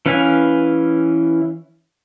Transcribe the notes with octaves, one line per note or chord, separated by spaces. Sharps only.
E3 C#4 B4 F5 G#5